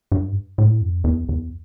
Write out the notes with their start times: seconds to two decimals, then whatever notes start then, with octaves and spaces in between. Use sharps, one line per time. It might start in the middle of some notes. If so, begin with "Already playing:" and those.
0.12 G2
0.58 A2
0.82 F2
1.04 E2
1.29 E2